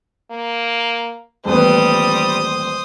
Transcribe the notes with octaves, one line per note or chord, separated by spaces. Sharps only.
A#3
D#1 A1 G3 B3 C5 D#6